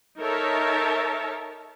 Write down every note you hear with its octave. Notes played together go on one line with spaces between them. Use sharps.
D#4 A4 A#4 C#5 E5 A5